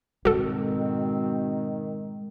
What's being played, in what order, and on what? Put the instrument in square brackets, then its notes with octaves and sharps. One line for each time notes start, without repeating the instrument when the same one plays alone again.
[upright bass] G#2 G#3 [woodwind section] B2 C4 [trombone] D#3 [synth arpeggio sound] F#4 A4